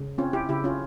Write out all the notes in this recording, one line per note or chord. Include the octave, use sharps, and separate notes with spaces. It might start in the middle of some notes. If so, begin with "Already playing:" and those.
Already playing: C#3
C4 C#4 F4
E4 G4
C#3 E4 G4
C#4 F4